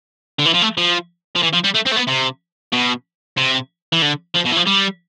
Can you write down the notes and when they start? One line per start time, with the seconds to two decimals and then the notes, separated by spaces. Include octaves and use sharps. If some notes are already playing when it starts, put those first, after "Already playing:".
0.39 D3
0.46 E3
0.54 F3
0.62 A3
0.77 F3
1.36 F3
1.43 E3
1.53 F3
1.64 G3
1.75 A3
1.87 C4
1.92 A3
1.97 B3
2.08 C3
2.72 B2
3.37 C3
3.93 E3
4.02 D3
4.35 F3
4.45 B2
4.51 E3
4.56 F3
4.67 G3